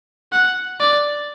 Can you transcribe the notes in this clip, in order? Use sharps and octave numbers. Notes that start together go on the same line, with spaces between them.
F#5
D5